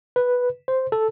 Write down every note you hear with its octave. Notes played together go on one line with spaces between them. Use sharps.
B4
C5
A4